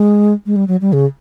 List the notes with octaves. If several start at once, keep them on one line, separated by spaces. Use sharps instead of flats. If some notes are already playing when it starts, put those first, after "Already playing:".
Already playing: G#3
G#3
G3
F#3
G3
C#3